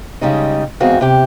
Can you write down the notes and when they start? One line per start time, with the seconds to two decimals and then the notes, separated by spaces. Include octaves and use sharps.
0.21 C#3 G3 G#3 D#4
0.80 E2 G#2 C4 F#4 G#4 F5
1.01 C3 G4